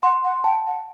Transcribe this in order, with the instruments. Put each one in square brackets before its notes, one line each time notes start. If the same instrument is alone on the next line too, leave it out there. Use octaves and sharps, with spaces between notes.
[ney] F#5 [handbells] C6
[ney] F#5
[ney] G5 [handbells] A5
[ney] F#5